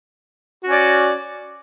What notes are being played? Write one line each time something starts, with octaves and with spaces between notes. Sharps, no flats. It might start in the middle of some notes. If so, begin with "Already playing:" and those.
C#4 F#4 D5